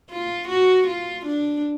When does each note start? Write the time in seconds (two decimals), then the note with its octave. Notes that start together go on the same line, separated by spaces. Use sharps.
0.10 F4
0.48 F#4
0.87 F4
1.26 D4